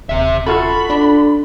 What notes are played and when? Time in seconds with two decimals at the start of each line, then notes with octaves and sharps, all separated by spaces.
0.09 D#1 C3 E5
0.46 F4 F#4 A4 B5
0.90 D4